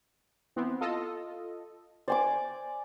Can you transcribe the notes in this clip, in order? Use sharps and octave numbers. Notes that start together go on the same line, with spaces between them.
E3 B3 C4
F4 A4 D#5
C5 D5 G#5 D6